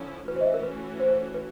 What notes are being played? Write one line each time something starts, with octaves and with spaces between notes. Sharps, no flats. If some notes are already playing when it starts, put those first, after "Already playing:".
Already playing: D3 F3 C#4 E4
E3 A3 C#4 F#4 B4
C5
D#5
E5
A#4
B4
C5
B4